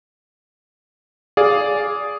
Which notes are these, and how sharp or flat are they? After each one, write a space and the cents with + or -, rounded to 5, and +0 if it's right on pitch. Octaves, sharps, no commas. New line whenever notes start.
G#4 +0 D5 -10 F5 +0